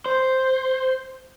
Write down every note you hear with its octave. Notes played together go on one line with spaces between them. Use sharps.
C5